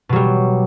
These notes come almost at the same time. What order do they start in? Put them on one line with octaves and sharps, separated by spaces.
B2 F#3 G3